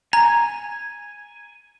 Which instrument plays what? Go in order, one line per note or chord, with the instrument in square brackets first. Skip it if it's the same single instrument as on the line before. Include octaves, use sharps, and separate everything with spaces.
[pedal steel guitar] G#5 [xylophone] A#5